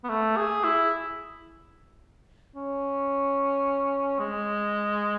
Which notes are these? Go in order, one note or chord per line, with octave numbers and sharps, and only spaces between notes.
B3
A3
G#4
E4
C#4
G#3